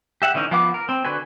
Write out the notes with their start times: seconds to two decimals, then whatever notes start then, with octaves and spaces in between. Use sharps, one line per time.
0.22 G4 E5 F#5
0.34 D3 E3 C#4 D#4
0.51 F3 B3 F5 F#5 D6
0.74 A#4
0.89 C4
1.05 D3 F#4 B4 G#5